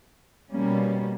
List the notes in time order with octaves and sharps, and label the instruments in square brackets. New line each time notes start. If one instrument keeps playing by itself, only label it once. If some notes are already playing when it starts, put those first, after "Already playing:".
[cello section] B2 G3 A#3 C#4